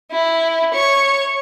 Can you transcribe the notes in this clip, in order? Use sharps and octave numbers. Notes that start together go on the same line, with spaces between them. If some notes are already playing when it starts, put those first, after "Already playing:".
E4
C#5 C#6